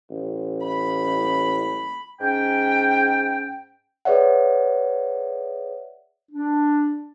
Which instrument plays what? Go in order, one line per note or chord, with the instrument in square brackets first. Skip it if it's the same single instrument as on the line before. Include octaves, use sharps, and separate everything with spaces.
[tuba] A1
[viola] B5
[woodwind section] G#2 C#4 G5
[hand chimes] G#4 B4 C#5 D5 E5 F#5
[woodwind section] D4